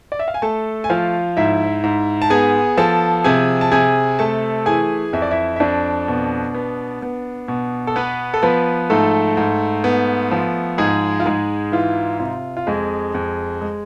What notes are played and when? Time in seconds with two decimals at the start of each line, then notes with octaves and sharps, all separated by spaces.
0.12 D5
0.19 E5
0.28 F5
0.34 G#5
0.42 A3 A4 A5
0.84 G#5
0.90 F3 F4 F5
1.37 G#2 E4 E5
1.84 G#2
2.22 A5
2.30 B3 G#4 G#5
2.78 F3 A4 A5
3.24 C3 G#4 G#5
3.61 A5
3.72 C3 G#4 G#5
4.19 A3 A4 A5
4.66 E3 G#4 G#5
5.13 F2 E5
5.22 D5
5.31 E4 E5
5.56 E5
5.60 F2 D4 D5
6.08 B2
6.54 B3
7.02 B3
7.48 B2
7.87 A4
7.96 B3 B4
8.34 A4
8.43 F3 B3 B4
8.90 G#2 A3 A4
9.37 G#2
9.84 B3
10.31 F3
10.78 G#2 G#3 G#4
11.20 F4
11.26 G#2 G#3 G#4
11.72 E3 F4
12.20 C3 F4
12.57 F4
12.67 F2 G#3 G#4
13.14 F2
13.61 G#3